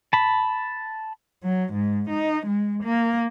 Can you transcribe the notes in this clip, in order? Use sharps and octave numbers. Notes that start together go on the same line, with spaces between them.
A5 B5
F#3
G#2
D#4
G#3
A#3